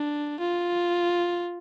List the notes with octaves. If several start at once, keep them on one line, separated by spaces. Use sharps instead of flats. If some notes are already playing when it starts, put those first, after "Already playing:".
Already playing: D4
F4